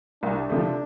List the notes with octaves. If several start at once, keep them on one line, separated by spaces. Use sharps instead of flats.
C2 D4
C3 F3 A3